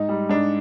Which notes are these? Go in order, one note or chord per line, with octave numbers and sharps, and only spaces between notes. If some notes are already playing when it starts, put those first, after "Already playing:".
Already playing: G#2 D#4
G3
G#2 D4